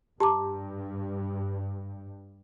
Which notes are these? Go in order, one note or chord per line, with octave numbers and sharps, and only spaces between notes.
G2 G4 A5 A#5 D6